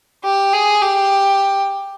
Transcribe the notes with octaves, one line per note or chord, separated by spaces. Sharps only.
G4
G#4
G4